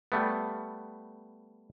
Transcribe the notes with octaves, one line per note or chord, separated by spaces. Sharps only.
G3 A3 B3